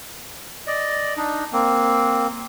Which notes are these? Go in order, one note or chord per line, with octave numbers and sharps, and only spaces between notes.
D5 D#5
D4 D#4
A#3 C4